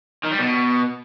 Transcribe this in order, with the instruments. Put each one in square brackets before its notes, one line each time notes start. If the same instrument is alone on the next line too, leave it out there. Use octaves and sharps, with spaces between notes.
[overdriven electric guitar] D#3
G3
B2